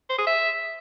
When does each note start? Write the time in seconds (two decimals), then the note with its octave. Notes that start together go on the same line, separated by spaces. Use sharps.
0.09 C5
0.18 G#4
0.27 E5